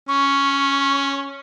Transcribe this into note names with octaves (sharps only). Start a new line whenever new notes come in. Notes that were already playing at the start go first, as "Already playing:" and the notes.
C#4 C#6